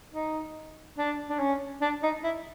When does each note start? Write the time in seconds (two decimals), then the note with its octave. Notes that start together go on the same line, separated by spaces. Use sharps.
0.13 D#4
0.98 D4
1.29 D4
1.39 C#4
1.81 D4
2.03 D#4
2.24 E4